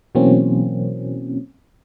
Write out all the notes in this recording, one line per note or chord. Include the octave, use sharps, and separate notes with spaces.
B2 E3 F#3 A#3 C4 C#4